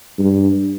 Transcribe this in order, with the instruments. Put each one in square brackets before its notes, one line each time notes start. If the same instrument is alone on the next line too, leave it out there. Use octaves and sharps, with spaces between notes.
[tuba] G2